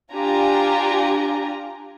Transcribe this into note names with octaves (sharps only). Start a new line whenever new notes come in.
D4 F4 G4 G#5 A#5